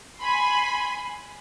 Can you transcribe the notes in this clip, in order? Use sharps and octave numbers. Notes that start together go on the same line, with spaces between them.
G#5 B5 C6